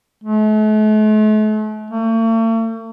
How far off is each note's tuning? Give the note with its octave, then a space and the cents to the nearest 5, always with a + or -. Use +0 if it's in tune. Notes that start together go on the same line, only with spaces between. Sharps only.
A3 -40
A3 +45